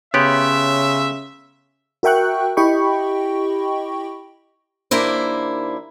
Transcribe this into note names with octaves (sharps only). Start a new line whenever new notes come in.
C#3 B3 G4 C#5 E5 C6
F#4 A#4 E5 G5 C#6 F#6
E4 G4 D#5 G5 B5 C#6
D#2 A#3 D4 E4 C5